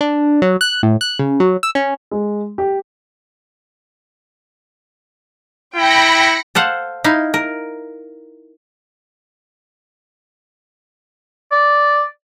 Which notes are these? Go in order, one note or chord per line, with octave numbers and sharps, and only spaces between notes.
D4
F#3
F#6
A2
F#6
C#3
F#3
E6
C#4
G#3
G4
E4 G5 B5 A#6 C#7
A4 C5 F5 F#5
D#4 E4 F5
A#4
D5